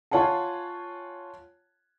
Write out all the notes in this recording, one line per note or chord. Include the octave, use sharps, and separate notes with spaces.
F4 C#5 F#5 G#5 A5